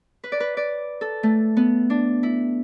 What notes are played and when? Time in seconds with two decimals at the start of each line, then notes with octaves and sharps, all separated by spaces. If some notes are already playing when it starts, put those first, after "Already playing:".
0.24 B4
0.32 D5
0.40 B4
0.57 D5
1.01 A4
1.23 A3
1.57 B3
1.90 D4
2.23 E4